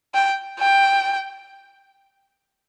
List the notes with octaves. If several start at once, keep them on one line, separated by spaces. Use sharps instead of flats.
G5
G5